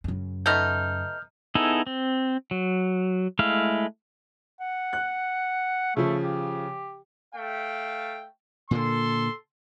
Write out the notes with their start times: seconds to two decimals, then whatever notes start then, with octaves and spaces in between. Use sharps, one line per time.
0.04 F#2 C#3
0.46 A3 B3 D#4 F6 G6
1.55 B3 D#4 E4 G#4 A4
1.87 C4
2.51 F#3
3.39 G#3 A3 E4 F5
4.60 F#5
4.93 F#6
5.97 C#3 F3 A3
6.24 G4
7.35 A3 F5 G5
8.71 A#2 D3 A#3 A4 C6